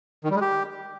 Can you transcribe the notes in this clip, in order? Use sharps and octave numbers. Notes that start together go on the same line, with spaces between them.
D#3
G3
G#3
G4